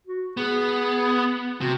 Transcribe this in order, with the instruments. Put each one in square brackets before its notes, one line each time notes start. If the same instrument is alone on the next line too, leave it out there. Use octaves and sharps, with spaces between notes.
[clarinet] F#4
[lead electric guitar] B3 [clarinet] G#4
[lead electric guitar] C3 [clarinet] F#4